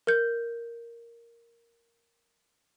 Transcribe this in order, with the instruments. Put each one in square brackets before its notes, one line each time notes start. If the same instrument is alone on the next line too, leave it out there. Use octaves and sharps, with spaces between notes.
[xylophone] A#4 G6